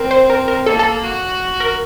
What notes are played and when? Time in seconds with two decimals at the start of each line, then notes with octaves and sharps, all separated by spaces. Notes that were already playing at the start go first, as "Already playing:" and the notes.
Already playing: C4 A#4
0.11 C5
0.30 A#4
0.48 A#4
0.66 A#3 A4
0.79 A4
1.04 F#4
1.60 A#4